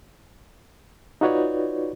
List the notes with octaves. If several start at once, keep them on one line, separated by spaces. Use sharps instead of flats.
D#4 F4 F#4 B4 C#5 D5